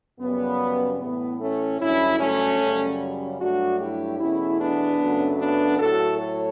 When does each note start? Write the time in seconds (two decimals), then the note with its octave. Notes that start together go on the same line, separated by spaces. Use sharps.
0.19 F#2 C#3 G3 B3
1.00 A2 E3 A3 B3
1.40 A3 C#4
1.80 G2 D3 F#3 C#4 E4
2.19 A3 C#4
2.60 F#2 C#3 G3
3.40 G2 F#3 A3 D4 F#4
3.80 E4 G4
4.19 E2 B2 A3 C#4 E4
4.59 B3 D4
4.99 F#2 C#3 F#3 A3
5.39 B3 D4
5.79 A2 F#3 A3 F#4 A4
6.19 A4 C#5